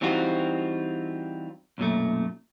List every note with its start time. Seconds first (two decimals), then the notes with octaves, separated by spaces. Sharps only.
0.01 E3 G3 C4 D#4 F4 F#4
1.78 B1 F#2 A#2 A3